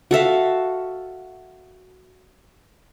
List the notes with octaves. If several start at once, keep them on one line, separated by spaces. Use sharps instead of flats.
F#4 A4 E5 F5